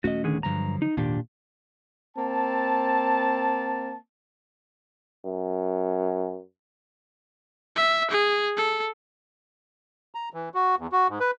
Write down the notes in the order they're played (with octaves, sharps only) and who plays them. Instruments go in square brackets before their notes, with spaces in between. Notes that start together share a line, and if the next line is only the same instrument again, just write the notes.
[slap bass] D#1 A3 C#4 [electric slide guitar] F#4 D#5
[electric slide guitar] D3 D#3 G#4
[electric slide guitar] G2 A#5 [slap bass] D3 F3 F#3
[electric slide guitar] D#4
[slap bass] G#1 D#2 [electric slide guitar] A#2 D4 G4
[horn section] A#3 C4 A5
[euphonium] F#2
[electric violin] E5
G#4
A4
[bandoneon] A#5
E3
F#4
E2
F#4
G#2
B4